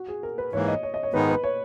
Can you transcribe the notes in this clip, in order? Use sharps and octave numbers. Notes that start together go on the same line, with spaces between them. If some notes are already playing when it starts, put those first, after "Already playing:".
Already playing: F#4
G#4
A#4
B4
G#2 E3 A#3 C#5
D#5
C#5
D#5
C#5
G#2 D#3 G#3 B3 D#4 B4
B4
C#5